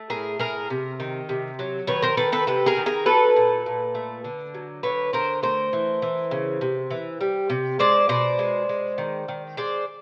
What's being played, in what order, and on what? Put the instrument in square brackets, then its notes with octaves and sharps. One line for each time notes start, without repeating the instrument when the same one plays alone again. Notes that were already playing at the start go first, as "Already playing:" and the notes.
Already playing: [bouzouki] A3
A2 G#4 A#4
A2 G#4 A#4
C3
D#3
C3
F#3
D#3 B4 C#5
A#4 C5
D#3 A4 B4
A4 B4
C3 A4 B4
G#4 A#4
D#3
G#4 A#4
F#3 A4 B4
A#2
A#2
A3
D3
F#3
D3 B4 C#5
D3 A#4 C5
A3 A#4 C5
E3
E3
C#3
C3
E3
G3
C3
G#3 C5 D5
B2 C5 D5
G#3
G#3
D#3
D#3
G#3 C5 D5